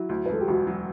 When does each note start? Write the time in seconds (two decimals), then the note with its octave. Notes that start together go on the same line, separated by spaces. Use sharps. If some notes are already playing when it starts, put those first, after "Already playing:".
Already playing: F#3 E4
0.09 D2
0.26 B4
0.29 E1 A4
0.41 G4
0.48 E1 F#4
0.67 F#3